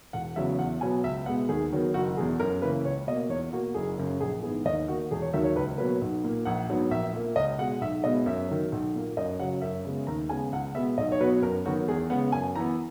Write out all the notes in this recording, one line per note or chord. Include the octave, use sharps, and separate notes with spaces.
E1 F#5
E2 C#3 F#3 B3 E5
E2 F#5
B2 F#3 B3 G#5
C#2 E5
B2 G#3 B3 F#5
D#2 G#4
D#3 F#3 B3
F#1 F#4
E2 B2 G#4
F#2 A#4
C#3 E3 A#3 B4
C#2 C#5
B2 A#3 D#5
E2 C#5
B2 A#3 F#4
F#1 G#4
F#2 C#3
A#1 G#4
G#2 E3 B3 G#4
D#2 D#5
D#3 A#3 F#4
E1 G#4
C#5
D#2 D#3 F#3 E5
C#5
C#2 B4
B2 F#3 A#3 B4
B1
A#2 A#3
A#1 F#5
G#2 F#3 B3
A#1 E5
A#2 A#3
C#2 D#5
B2 G#3 F#5
B1 E5
B2 G#3 B3 D#5
F#2 E5
D#3 F#3
B1
A#2 A#3
F#2 D#5
C#3 F#3 F#5
F#2 E5
C#3 G#3 B3
D#2 A#5
C#3 G#3 B3 G#5
C#2 F#5
B2 G#3 B3 E5
B1 D#5
C#5
B2 F#3 B3 B4
F#2 A#4
D#3 F#3 B3 F#4
E2 G#4
C#3 G#3 B3 F#5
F#2 G#5
E3 B3 A#5